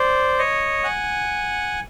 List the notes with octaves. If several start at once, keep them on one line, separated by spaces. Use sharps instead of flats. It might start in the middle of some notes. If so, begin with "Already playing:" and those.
Already playing: C5 D5
C#5 D#5
F#5 G#5